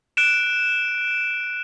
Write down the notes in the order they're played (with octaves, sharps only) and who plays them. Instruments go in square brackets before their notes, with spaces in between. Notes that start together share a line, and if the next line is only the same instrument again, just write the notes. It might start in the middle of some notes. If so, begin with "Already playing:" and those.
[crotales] F#6 D7 E7